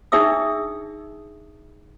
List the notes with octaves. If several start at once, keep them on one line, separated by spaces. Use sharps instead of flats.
D4 D#4 G#4 E5 D#6 E6